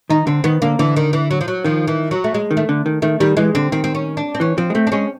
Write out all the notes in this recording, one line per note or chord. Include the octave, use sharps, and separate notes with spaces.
D#3 D#4
D3 C4
D#3 B3
D3 A#3
D3 E3
D#3
E3
F#3
F3
F#3
D#3 F3
E3
F#3
A3
G#3
D#3
A3
D3
D#3
D#3 A3
D#3 G3
E3 G#3
D3 C4
D#3 C4
C4
C#4
D4
C4
E3 C#4
F3 C4
G#3
A3 C4
D4
G#3 C#4